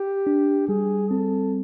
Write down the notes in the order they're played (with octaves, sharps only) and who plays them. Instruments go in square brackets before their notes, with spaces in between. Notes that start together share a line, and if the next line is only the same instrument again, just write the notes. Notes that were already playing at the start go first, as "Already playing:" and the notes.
Already playing: [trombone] G4
[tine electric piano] D4
[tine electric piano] G3 [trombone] G#4
[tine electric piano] C4 [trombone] A4